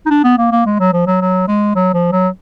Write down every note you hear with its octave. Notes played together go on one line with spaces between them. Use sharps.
D#4
D4
B3
A#3
A#3
G#3
F#3
F3
F#3
F#3
G#3
F#3
F3
F#3